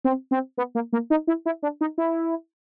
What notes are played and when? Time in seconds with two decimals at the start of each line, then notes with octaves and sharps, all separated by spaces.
0.04 C4
0.31 C4
0.57 B3
0.75 A#3
0.93 A#3
1.10 D#4
1.27 E4
1.46 E4
1.63 D4
1.81 D#4
1.98 E4